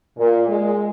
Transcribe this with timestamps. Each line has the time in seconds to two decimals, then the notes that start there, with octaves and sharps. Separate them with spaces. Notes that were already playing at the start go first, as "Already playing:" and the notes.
0.17 A#2
0.47 G#3